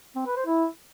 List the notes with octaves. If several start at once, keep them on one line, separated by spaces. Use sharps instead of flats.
C4
B4
C5
E4